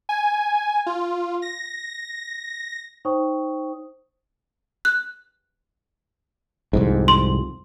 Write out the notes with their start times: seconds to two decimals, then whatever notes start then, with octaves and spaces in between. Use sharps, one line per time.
0.09 G#5
0.86 F4
1.42 A#6
3.05 D#4 C5 C#5 G5 C#6 D#6
4.85 F#6
6.73 C2 F2 G#2
7.08 C6